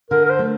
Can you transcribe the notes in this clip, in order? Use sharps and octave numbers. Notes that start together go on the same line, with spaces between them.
D3 A#4
A#4
C5
A3